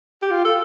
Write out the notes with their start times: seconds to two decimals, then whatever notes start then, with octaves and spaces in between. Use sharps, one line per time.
0.22 G4
0.31 F4
0.45 A4